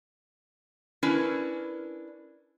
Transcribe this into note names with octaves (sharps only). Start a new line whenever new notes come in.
C#4 D4 E4 A#4 B4